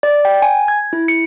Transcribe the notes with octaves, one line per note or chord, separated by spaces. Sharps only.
D5
G5
G#5
G#6
E4
C#7